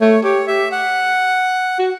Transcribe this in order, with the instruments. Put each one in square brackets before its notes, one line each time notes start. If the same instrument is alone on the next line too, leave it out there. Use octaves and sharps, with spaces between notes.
[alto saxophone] A3 [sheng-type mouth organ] C#5
[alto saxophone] G4 [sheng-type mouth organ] C#5
[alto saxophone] G4 [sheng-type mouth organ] E5
[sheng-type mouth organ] F#5
[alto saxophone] F#4